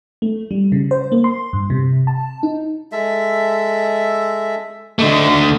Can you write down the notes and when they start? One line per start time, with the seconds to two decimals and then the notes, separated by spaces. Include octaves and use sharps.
0.22 A3
0.51 G3
0.72 C#3
0.91 C5
1.12 A#3
1.24 C6
1.53 G2
1.70 C3
2.07 A5
2.43 D#4
2.92 G#3 A4 E5
4.99 D3 A3 D#4 D#5 D6